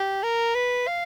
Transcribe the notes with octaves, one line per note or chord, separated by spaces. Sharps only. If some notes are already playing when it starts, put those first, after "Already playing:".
Already playing: G4
A#4
B4
F5